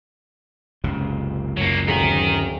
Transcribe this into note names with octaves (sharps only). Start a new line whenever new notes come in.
F#1 C#2 C3
F#2 F#3 A#3
D1 D#4 A#4 B6 F#7